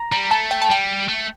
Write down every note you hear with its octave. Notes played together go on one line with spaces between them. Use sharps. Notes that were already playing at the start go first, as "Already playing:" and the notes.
Already playing: A#5
G3 A#5
A3 A5
G5
A5
G3 G5
A3